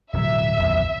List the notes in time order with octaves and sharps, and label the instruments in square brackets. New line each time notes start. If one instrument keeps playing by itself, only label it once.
[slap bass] D1 B2 F#3 [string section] E5
[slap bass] D#1 B1 F2